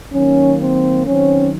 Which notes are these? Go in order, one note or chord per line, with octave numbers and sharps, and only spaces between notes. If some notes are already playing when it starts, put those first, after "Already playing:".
D#3 F#3 A#3 C#4
C4
D#3 F#3 C4 C#4